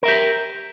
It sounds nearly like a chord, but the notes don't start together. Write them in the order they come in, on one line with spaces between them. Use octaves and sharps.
A#4 E5 G4